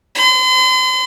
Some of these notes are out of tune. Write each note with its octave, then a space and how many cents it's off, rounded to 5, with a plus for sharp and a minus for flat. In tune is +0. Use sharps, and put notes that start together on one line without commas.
C6 -40